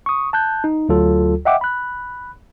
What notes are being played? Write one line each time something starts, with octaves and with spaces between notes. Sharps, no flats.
C#6 D#6
A5 F#6 G6
D#4
D2 F#3 F4 A4
D#5 E5 F#5 G5 D6
B5 F#6